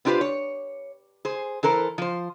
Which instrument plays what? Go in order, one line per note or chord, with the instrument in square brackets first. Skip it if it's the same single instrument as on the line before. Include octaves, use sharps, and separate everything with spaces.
[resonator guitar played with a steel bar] B3 D4 F4 G4 B4 C5
C#5
G#4 C5
E3 A4 A#4 C5
F3 C5